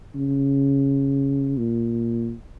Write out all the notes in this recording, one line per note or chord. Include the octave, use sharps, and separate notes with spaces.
C#3
A#2